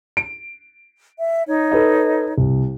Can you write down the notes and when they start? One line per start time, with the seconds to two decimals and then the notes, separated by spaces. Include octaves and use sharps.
0.17 D7
1.19 E5
1.46 D#4 C#5
1.72 A4 B4 D#5
2.38 C2